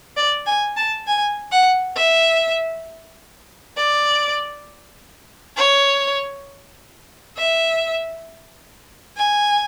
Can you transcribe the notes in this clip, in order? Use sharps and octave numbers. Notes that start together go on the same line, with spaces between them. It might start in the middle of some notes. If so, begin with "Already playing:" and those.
D5
G#5
A5
G#5
F#5
E5
D5
C#5
E5
G#5